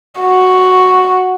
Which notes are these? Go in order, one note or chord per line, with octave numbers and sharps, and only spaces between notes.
F#4